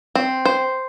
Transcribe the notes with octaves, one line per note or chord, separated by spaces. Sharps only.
C4
C5